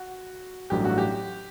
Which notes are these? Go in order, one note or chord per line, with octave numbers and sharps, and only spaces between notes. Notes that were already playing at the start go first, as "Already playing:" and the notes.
Already playing: F#4
A1 G2 F#3 A3 G4
F#4
G4